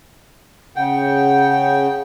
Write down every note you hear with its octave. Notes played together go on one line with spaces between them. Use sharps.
C#3 F#5 G5